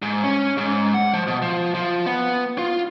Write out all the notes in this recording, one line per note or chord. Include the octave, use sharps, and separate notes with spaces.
G#2
C#4
G#2
F#5
F3
B2
F3
F3
B3
F4